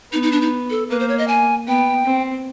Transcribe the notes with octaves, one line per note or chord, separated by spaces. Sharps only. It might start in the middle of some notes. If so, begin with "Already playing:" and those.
B3 D#4
D#4
D4
D#4
A4
A#3 B4
C5
C#5
D#5
G#5
B3 G5
C4